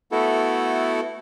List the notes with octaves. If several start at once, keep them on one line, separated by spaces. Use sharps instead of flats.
A3 B3 E4 F#4 A4